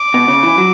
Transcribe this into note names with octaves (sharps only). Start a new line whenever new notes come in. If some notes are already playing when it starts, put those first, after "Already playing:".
Already playing: D6
B2
C#3
E3
F#3